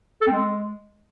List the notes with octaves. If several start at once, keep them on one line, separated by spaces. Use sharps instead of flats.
A4
C4
G#3